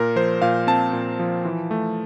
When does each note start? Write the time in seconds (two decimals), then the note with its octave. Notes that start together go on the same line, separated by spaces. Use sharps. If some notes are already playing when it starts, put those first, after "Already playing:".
Already playing: A#2 A#4
0.16 F3 C5
0.42 A#2 F5
0.67 C4 A5
0.93 A#2
1.19 F3
1.45 E3
1.71 A3